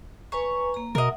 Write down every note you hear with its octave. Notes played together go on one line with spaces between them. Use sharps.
B4 C#5 G#5 A#5
A#3 A#5
B2 A#4 D#5 E5 F#5